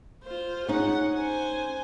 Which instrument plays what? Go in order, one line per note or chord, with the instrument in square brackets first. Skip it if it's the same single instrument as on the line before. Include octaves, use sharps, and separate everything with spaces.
[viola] F4 C5
[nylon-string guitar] C#4 D#4 [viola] G#4 F#5
[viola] C5 G#5